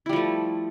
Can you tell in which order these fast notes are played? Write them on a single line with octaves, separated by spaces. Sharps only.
E4 G3 F3 A3